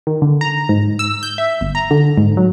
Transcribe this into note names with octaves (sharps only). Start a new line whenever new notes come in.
D#3
D3
A#5
G#2
E6
G6
E5
G1
A#5
D3
G#2
F#3